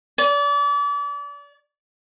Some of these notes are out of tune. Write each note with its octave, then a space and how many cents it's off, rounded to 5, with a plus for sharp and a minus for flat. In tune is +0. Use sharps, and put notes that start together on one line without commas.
D5 -35